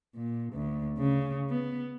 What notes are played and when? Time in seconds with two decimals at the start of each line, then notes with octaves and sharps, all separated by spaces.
0.15 A#2
0.54 D2
0.98 C#3
1.50 B3